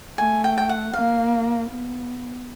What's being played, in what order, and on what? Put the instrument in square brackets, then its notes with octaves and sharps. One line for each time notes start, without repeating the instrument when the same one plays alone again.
[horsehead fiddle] A3 [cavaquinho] G#5
[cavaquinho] G5
G5
F#5
[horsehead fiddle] A#3 [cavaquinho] F5
[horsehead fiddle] B3